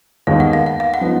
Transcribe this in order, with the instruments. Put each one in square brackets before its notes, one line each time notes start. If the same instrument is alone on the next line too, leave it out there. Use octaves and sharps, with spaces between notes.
[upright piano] D#2 D#3 G#3 B3 [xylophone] F5
[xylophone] F#5
F5
F#5
F5
F#5
[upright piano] F3 B3 D#4